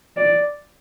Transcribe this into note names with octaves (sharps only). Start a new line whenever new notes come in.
D5